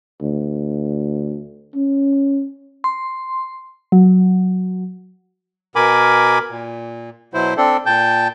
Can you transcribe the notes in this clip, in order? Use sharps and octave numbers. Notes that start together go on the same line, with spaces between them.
D2
C#4
C6
F#3
B2 A#4 G#5 B5 D6
A#2
B2 F#3 E4 C5
C4 D4 A4
A#2 G5 A5 G6